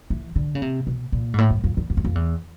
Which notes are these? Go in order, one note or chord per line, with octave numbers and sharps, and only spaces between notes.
E3
D3
C#3
C3
B2
A#2
G#2
A2
G2
F2
E2
F2
F#2
F2
E2